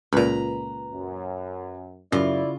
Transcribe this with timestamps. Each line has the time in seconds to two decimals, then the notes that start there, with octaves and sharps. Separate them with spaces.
0.13 C#2 A#2 B4 A#5
0.92 F#2
2.12 F#2 C#3 E4 F4 D5